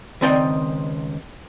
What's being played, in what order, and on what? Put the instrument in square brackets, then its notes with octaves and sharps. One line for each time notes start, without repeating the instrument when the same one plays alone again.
[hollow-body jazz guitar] C#2 D#3 C4 D5 D#5 G5